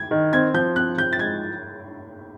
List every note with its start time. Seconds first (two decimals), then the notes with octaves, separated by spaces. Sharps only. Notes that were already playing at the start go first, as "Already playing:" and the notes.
Already playing: G#6
0.11 D#3
0.33 C4 G#6
0.54 F3 G6
0.76 C4 F#6
0.98 F3 G6
1.13 A6
1.19 G#3 G#6